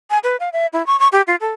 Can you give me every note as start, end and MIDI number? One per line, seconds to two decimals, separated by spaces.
0.10 0.18 80
0.24 0.36 71
0.40 0.49 77
0.53 0.67 76
0.73 0.85 64
0.87 0.99 85
0.99 1.08 85
1.12 1.22 67
1.27 1.36 65
1.41 1.53 69